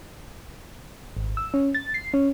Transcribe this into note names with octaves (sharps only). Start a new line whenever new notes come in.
G#1
E6
C#4
A6
C7
C#4